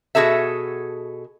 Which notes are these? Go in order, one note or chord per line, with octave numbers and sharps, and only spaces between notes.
B2 F#4 G#4 A4 E5